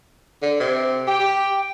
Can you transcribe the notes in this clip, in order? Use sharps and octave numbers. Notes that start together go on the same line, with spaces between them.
D3
C3
G4 G5
G4